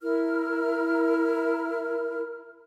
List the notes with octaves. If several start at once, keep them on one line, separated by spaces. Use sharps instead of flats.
E4 A#4 F6